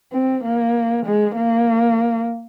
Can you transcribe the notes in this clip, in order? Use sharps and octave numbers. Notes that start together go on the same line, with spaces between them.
C4
A#3
G#3
A#3